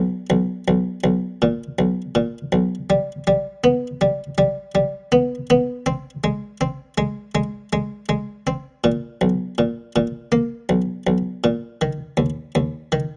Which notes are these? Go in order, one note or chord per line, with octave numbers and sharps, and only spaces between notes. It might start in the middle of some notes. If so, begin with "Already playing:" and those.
Already playing: B1
B1
B1
B1
A#2
B1
A#2
B1
G3
G3
B3
G3
G3
G3
B3
B3
C4
G#3
C4
G#3
G#3
G#3
G#3
C4
A#2
B1
A#2
A#2
A#3
B1
B1
A#2
D#3
D#2
D#2
D#3